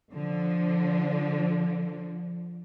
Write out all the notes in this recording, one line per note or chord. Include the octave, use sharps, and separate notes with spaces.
D3 F3